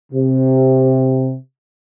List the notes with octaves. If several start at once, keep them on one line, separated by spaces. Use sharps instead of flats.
C3